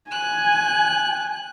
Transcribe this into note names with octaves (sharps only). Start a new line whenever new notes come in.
G#5 F#6